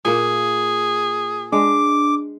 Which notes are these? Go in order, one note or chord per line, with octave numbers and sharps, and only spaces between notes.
A#2 A#3 G#4
G#3 D4 D6